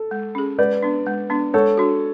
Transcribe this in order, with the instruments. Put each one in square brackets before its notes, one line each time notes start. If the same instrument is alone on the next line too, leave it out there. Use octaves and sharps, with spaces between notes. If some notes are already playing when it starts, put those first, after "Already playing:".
Already playing: [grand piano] A4
[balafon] G#3
C#4 G#4
[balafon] G#3 [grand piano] B4 D5
[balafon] B3 D4
G#3
B3 D4
[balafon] G#3 [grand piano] A4 C#5
[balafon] D4 F#4